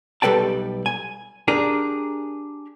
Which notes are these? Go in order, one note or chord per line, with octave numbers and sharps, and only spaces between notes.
B1 G3 A4 B4 G5 A5
G#5
D4 G4 G#4 A#4